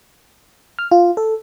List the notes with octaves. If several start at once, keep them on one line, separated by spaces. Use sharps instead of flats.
F6
F4
A4